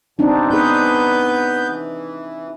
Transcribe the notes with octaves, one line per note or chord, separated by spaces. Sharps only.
G2 B2 C4 D4 D#4
B3 D#4 G#4 B4 G6
E3